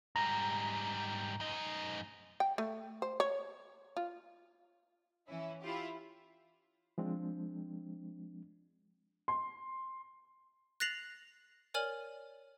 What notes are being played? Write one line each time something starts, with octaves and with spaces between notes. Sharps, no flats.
G#2 G3 A#5
F#2 D#4
G5
A3
C5
C#5
F4
E3 C#4 E4
E4 F4 G4
F3 G#3 C4 D4
C6
F#6 A6 A#6 C7 F7 F#7
A#4 C#5 D5 G#5 F6 F#7